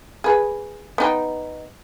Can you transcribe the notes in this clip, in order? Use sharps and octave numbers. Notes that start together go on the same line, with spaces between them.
G#4 B4
B3 D#4 G5